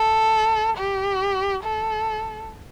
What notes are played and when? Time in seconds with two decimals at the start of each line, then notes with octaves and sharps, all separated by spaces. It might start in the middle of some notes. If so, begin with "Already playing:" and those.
Already playing: A4
0.78 G4
1.63 A4